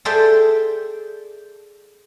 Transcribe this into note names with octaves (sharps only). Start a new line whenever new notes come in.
G#4 A4 C5 D5 E5 G5